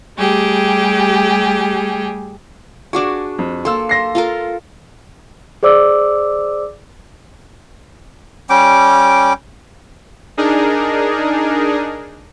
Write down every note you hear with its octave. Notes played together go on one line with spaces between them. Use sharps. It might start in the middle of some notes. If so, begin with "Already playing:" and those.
G3 A3 G4 G#4
D4 F#4 G#4 C#6 D6
F2
A#3 A4 C6 E6
C6 A#6 C7
F4 A4 A#4
G#4 C5 D5 D6 E6
G3 C#4 G5 D6
D4 D#4 G#4 A#4